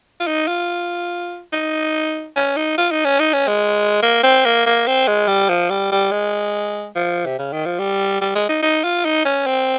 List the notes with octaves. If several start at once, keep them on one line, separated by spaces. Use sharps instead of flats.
F4
D#4
F4
D#4
C#4
D#4
F4
D#4
C#4
D#4
C#4
G#3
A#3
C4
A#3
A#3
C4
G#3
G3
F3
G3
G3
G#3
F3
C3
C#3
D#3
F3
G3
G3
G#3
D#4
D#4
F4
D#4
C#4
C4